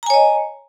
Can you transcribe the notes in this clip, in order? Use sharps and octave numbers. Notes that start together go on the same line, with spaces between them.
C#5 D#5 G#5 A#5